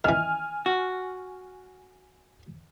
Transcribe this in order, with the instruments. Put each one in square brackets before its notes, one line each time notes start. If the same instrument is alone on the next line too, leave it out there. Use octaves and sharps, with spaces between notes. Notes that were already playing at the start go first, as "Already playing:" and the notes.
[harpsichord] D#3 E3 [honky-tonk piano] G#5 F6
[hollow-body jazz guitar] F#4